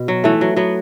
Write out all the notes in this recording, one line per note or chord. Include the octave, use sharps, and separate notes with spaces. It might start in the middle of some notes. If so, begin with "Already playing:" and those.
Already playing: B2
F#3
E3 A3
F#3
F#3 B3